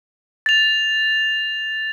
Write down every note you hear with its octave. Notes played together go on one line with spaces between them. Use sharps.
A6 F7